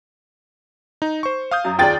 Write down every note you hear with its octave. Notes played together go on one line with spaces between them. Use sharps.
D#4
C5 C#6
F5 D#6 G6
F#2
D#2 F4 G#4 D5 G5 A6